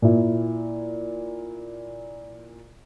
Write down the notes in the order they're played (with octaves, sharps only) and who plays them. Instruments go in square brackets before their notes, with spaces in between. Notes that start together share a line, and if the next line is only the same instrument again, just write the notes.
[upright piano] A#2 E4